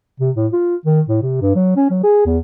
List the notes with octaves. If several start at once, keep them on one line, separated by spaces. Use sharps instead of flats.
C3
A2
F4
D#3
A2
C3
G2
F#3
C#4
F#3
G#4
E2